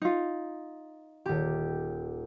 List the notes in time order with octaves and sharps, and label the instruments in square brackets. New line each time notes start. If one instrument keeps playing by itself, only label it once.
[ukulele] D#4 F4
[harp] D#1 G4